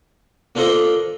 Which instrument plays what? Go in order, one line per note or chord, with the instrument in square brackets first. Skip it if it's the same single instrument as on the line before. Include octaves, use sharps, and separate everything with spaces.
[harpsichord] A#3 D4 F4 A4 C5 D#5